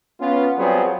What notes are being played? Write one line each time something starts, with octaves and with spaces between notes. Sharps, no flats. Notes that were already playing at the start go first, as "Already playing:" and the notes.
B3 C#4 F4
F#3 G3 B3 C4 F4 G#4